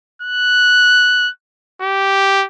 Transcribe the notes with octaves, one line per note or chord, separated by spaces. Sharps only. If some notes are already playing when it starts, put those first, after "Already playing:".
F#6
G4